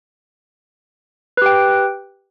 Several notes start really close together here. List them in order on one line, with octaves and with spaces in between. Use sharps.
B4 G4 G5